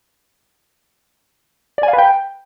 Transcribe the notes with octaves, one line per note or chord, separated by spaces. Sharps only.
D5
G#5
F5
B4
G5